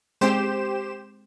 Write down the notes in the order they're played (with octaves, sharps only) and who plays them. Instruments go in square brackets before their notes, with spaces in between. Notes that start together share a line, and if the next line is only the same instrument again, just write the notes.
[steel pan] G#3 C4 G5 [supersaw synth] G4 C5 E7